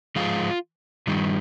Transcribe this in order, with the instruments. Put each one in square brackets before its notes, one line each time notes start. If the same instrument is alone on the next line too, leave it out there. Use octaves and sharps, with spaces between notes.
[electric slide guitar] G#2 F3 G#3 F4
G2 D#3 G3